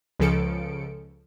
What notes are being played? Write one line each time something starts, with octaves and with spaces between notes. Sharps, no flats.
C#2 C#3 F3 A4 C#7 D7